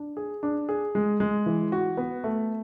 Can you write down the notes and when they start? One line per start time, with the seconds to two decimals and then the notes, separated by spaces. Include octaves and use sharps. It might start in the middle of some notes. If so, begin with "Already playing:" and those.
Already playing: D4
0.17 G#4
0.43 D4
0.69 G#4
0.95 G#3
1.20 G#3
1.46 E3
1.72 F#4
1.97 B3
2.24 A3